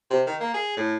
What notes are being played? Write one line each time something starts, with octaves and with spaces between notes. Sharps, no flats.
C3
D#3
A#3
G#4
A2